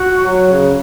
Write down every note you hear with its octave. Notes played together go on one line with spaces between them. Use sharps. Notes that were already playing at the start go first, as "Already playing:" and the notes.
Already playing: F#4
F#3
C#3